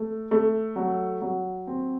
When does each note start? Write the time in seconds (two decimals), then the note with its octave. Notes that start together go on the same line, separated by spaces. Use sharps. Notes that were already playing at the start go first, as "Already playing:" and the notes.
Already playing: A3
0.31 A3
0.76 F#3
1.22 F#3
1.67 C4